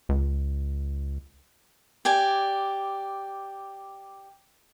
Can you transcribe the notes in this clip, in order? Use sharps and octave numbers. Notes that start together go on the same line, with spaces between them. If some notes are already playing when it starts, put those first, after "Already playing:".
C#2
G4 D5 G#5